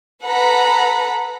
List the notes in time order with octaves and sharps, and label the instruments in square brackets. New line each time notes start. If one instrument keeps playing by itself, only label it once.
[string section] A4 B4 F#5 A#5 B5